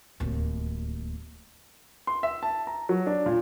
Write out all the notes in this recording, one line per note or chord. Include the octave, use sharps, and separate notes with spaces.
D1 D#2
C6
E5
A5
A#5
F#3
D4
A#2